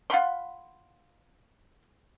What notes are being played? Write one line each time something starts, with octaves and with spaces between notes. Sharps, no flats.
F4 F#5 B5 C6